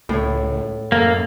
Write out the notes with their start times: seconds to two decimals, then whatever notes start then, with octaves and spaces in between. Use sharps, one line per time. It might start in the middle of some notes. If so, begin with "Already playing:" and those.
0.09 C#2 A2 C#5
0.92 F#2 A#3 A4